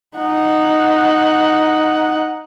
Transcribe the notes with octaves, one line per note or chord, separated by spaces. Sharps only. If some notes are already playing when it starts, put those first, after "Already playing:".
D#4 F#5